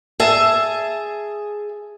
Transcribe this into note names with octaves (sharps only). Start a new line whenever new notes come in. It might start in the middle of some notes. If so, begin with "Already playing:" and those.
G#4 E5 A5